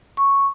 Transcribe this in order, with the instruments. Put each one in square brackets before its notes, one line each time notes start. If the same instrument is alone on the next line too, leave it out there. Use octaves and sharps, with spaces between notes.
[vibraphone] C#6